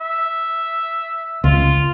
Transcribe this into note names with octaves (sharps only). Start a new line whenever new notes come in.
E5
C#2 F4